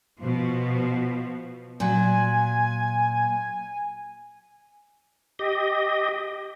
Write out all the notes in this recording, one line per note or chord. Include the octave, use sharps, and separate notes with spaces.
B2 F3
A#2 F#3 G#5
G4 D#5